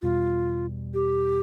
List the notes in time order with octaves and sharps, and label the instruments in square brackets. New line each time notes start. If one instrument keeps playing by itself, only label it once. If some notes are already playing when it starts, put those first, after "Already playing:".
[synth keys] E2 B2 G3 [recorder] F4
[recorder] G4